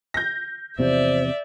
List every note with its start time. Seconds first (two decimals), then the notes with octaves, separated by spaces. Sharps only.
0.14 G6 A#6
0.79 E2 C3 F3 C5 D5 E5